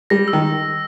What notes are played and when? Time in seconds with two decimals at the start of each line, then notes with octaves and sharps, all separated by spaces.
0.10 G3 A#6
0.28 E6
0.33 D#3